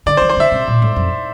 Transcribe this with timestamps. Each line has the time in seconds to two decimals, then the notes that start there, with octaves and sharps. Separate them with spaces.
0.06 D3 D5
0.17 C5
0.21 E3
0.29 C5
0.37 D3 E5
0.52 C3
0.67 A#2
0.82 A2
0.96 F2